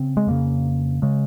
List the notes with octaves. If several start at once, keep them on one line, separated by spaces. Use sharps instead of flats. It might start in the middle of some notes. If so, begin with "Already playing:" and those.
Already playing: C#3 C4
G#3
F2 C#3 A#3
C#3 G#3